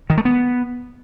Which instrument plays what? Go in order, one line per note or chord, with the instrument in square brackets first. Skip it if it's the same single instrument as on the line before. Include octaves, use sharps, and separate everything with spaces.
[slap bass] D#3
A3
B3